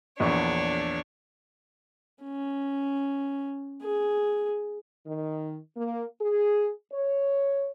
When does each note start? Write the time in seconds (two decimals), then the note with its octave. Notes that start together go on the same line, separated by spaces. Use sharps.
0.20 A#1 E2 D4 C#5 C#6
2.23 C#4
3.82 G#4
5.06 D#3
5.76 A#3
6.20 G#4
6.92 C#5